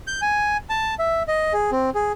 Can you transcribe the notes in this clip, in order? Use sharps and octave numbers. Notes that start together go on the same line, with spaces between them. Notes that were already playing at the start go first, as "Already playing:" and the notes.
G6
G#5
A5
E5
D#5
G#4
C4
G#4